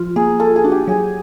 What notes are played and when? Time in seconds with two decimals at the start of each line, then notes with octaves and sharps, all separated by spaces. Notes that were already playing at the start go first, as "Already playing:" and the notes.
Already playing: F3 F4
0.16 A#3 G#4
0.40 F4 A4
0.56 G#4
0.64 D4 F#4
0.72 G4
0.88 F#3 G#4